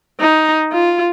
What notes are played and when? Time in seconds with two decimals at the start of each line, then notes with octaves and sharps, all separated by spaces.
0.20 D#4
0.72 F4